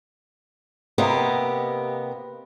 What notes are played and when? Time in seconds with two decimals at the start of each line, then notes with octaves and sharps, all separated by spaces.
0.98 C3 A#3 B3 G4 D#5 E5